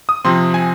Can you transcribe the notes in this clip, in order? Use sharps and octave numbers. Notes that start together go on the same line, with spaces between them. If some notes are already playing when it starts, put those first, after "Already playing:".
D#6
C3 F3 C4 C6
G#5